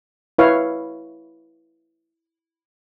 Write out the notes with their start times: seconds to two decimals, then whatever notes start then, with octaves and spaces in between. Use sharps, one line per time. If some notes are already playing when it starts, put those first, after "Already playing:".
0.38 E4 B4 C#5 F5